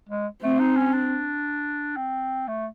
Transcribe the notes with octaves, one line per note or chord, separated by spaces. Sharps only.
G#3
A3 C4
D#4
C#4
D4
C4
A3